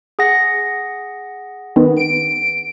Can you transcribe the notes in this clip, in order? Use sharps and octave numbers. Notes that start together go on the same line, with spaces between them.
G#4 F#5 A#6
D#3 B3
D7